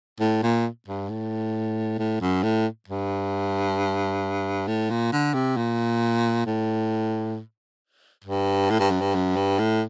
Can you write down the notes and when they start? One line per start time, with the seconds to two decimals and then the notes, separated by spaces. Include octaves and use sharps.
0.20 A2
0.43 A#2
0.88 G2
1.09 A2
1.99 A2
2.21 F#2
2.43 A2
2.88 G2
4.67 A2
4.90 A#2
5.12 D3
5.34 C3
5.57 A#2
6.46 A2
8.24 G2
8.70 A2
8.80 G2
8.91 F#2
9.01 G2
9.15 F#2
9.36 G2
9.59 A2